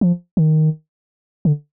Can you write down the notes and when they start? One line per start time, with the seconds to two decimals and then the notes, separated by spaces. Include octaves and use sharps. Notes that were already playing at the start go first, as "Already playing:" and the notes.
0.01 F3
0.37 D#3
1.45 D3